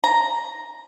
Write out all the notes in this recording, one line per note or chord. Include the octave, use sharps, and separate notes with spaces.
A#5